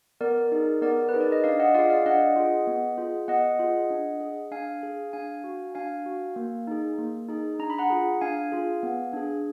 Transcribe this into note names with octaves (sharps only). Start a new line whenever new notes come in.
B3 A#4 D5
D#4 G#4
B3 A#4 D5
B4
D#4 G#4
D5
D#5
D4 D5 F5
D#5 F#5
F4 G#4 D5 F5
D5 F5
D4 D#5 F#5
F4 G#4
B3
F4 G#4
B3 D#5 F#5
F4 G#4
D4
G#4
D4 F5 G#5
G#4
D4 F5 G#5
F#4
D4 F5 G#5
F#4
A#3
D#4 G#4
A#3
D#4 G#4
D4 A#5
B5
F#5 A#5
F4 G#4
D4 F5 G#5
F4 G#4
B3
D4 G#4